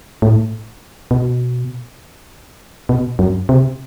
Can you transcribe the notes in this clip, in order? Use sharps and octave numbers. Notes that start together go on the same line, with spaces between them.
A2
B2
B2
F#2
C3